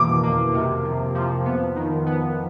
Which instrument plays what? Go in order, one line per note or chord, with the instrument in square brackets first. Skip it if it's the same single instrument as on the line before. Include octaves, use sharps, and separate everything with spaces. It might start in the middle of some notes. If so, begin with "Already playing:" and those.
Already playing: [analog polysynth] B2 E3 A#3 [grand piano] D6
[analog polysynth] A#3
C3
F3
F3
B3
D#3
B3